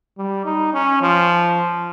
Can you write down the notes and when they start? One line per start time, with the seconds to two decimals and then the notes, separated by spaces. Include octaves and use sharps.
0.18 G3
0.45 D#4
0.73 C#4
1.02 F3